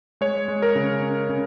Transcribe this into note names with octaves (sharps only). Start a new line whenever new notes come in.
G#3 C#5
G#3
A#4
C#3
C#4
C#3